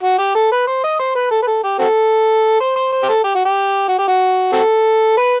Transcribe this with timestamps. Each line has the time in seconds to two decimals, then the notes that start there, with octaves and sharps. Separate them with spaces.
0.03 F#4
0.19 G4
0.35 A4
0.52 B4
0.67 C5
0.84 D#5
0.99 C5
1.15 B4
1.31 A4
1.42 B4
1.47 A4
1.64 G4
1.79 C4 F#4 A4
2.60 C5
2.76 C5
2.92 C5
3.03 G4
3.08 A4
3.24 G4
3.34 F#4
3.45 G4
3.88 F#4
3.98 G4
4.08 F#4
4.53 C4 F#4 A4
5.17 B4